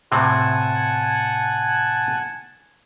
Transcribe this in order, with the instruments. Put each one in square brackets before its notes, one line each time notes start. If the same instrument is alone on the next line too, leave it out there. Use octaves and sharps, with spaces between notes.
[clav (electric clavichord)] A2 C3 C4 [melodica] F#5 G#5 A5